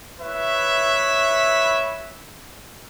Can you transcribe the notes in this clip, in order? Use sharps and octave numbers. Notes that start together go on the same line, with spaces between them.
E4 B4 C#5 E5